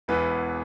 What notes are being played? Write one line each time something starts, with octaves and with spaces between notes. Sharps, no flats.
E1 E2 E3 B3 B4